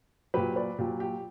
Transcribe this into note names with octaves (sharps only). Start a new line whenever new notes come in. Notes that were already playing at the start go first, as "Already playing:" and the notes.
A#2 F#3 G4 B4
B4 D5
A#2 F#3 G4
G4